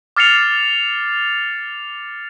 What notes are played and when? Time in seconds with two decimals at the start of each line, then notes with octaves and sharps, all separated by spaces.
0.17 D6 F6 A6 C7 C#7 F7